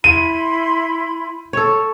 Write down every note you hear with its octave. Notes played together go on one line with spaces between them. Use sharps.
E4 B5 C6 D#7
A4 C#5